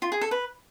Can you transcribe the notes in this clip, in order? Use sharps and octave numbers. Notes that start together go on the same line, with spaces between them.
F4
G#4
A4
B4